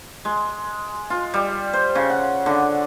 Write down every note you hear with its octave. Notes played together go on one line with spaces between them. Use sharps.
G#3
F4
G3
C5
C#3
F#5
D3